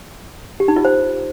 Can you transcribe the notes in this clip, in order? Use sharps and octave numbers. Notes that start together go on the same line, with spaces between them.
G4
D#4
F4
C5